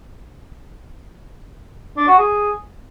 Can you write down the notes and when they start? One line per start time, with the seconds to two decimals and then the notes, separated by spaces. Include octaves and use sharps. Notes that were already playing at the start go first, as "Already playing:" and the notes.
1.97 D4
2.08 F#4
2.18 G#4